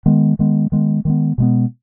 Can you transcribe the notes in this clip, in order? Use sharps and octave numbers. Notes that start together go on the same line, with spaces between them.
D#3 G#3 B3
D#3 G#3 B3
D#3 G#3 B3
D#3 G#3 B3
B2 G#3 B3